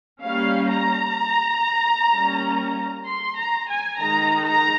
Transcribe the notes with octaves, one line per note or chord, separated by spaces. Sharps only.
G3 A#3 C#4 F5
A#5
G3 A#3 C#4
C6
A#5
G#5
D#3 G#3 D#4 A#5
A#5